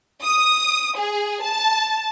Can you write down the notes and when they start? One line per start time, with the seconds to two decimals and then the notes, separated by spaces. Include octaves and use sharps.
0.23 D#6
0.97 G#4
1.43 A5